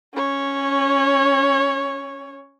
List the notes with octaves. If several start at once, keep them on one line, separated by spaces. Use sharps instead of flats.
C#4 C#5